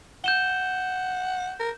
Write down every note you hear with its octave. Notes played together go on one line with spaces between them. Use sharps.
F#5 G6 E7 G7
A#4